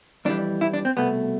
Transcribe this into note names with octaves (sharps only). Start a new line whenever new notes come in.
F2 E3 G3 D4
E4
D4
C4
C2 B2 A3 B3